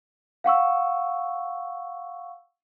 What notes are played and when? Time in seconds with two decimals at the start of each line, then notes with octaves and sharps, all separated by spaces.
0.44 F5 F#5 C#6 E6